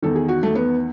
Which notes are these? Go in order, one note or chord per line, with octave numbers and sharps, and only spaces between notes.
E2 D#3 A4
G#4
F#4
A3
B3